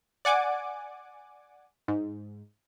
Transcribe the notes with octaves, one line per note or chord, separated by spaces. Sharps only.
D5 F#5 G#5 D6
G#2